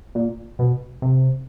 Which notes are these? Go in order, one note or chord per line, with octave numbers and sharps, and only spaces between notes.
A#2
B2
C3